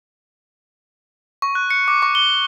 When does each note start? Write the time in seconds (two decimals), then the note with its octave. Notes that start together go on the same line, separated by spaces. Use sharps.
1.42 C#6
1.55 F#6
1.70 C#7
1.88 D6
2.02 C#6
2.15 G7